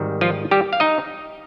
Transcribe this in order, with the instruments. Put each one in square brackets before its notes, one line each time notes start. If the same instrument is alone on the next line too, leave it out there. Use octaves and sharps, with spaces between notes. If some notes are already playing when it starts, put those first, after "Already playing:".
Already playing: [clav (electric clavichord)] G#1 G#2 D#3 G3
F3 F4
G3 G4
F5
D#4 D#5